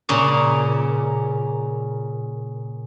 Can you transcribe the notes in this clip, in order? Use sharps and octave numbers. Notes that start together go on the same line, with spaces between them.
A#2 C#3 C#4